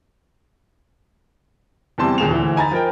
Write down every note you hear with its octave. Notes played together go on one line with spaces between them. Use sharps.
E2 C3 E3 G3 A5 C6
D#2 A#2 G#4 A5 E7 F7
D2 E3
D#4 G#5 A#5 B5 A6
F3 A#4 G5